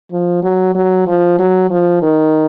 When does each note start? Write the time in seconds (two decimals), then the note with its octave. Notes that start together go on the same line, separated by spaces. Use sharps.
0.12 F3
0.43 F#3
0.75 F#3
1.07 F3
1.39 F#3
1.71 F3
2.02 D#3